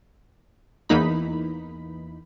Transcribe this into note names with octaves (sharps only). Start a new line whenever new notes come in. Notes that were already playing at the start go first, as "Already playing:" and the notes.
E2 E3 A#3 D#4 B5